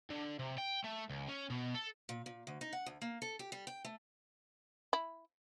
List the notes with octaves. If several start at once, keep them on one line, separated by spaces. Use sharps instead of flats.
D3
C3
G5
A3
C#2
C#4
B2
A4
A#2
A#2
D2
D#4
F#5
D2
A#3
A4
G4
G3
G5
A3
E4